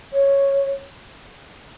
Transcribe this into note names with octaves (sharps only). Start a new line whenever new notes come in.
C#5